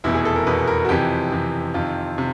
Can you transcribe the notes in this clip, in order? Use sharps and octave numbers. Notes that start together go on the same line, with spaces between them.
F1 E2 B2 E4
G#4
A4
A#4
F1 E2 B2 B4
A#4
F#4
F2 C3 E3 G4
F2 C3 E3
F2 C3 D#3 F4
C3